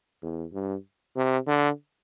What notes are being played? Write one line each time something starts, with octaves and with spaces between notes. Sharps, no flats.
E2
G2
C3
D3